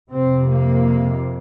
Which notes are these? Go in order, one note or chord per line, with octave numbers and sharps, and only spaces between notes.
F2 C3 C4
A#3